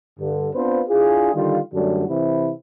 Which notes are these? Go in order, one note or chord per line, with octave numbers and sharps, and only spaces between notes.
G2 D3
B3 C4 D4 F4 B4 C5
D4 E4 F4 G#4
D3 D#3 G3 F4
F#2 D3 G3 A3 D4 F#4
C3 E3 C4 E4